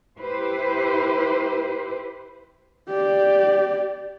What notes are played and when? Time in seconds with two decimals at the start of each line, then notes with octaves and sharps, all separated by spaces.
0.21 E4 G4 B4 C5
2.89 G4 D5